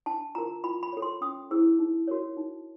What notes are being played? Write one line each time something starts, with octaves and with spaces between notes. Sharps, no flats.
D4 A5
F4 A#4 A#5
F4 B5
B5
A4 C#5
C6
C#4 D#6
E4 G#4 C5 E6
D#4
F#4 A#4 C#5
D#4